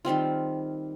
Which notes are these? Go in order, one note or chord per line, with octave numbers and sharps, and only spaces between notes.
D#3 G3 C4 F4